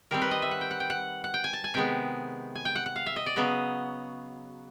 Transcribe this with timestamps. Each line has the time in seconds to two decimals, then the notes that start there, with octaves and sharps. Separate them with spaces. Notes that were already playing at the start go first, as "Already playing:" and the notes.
0.11 D#3 G3 C4 A#4
0.22 B4
0.31 D#5
0.42 E5
0.51 F#5
0.61 G5
0.71 F#5
0.80 G5
0.90 F#5
1.24 F#5
1.34 G5
1.44 G#5
1.53 A5
1.64 G#5
1.74 C3 D#3 G#3 B3 G5
2.55 G#5
2.65 G5
2.75 F#5
2.86 F#5
2.96 F5
3.06 E5
3.16 D#5
3.26 D5
3.36 C#3 F#3 B3 D#5